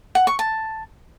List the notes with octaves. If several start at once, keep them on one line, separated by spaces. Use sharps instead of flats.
F#5
C#6
A5